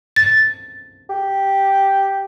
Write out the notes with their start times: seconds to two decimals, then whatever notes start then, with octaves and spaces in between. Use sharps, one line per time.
0.16 A6
1.10 G4